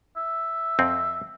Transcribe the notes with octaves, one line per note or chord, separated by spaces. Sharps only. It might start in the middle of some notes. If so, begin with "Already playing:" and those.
E5
F2 C4